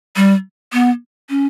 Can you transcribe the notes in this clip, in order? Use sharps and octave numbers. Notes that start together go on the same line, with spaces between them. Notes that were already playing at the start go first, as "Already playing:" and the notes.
G3
B3
C#4